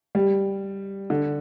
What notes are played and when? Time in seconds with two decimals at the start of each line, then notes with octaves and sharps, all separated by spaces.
0.15 G3
1.10 D3